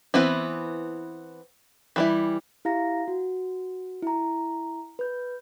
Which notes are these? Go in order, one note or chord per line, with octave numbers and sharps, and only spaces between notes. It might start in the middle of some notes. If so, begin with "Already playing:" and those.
E3 B3 C4 E4
E3 G3 E4
E4 G4 F5 A#5 A#6
F#4
E4 A#5
B4 G6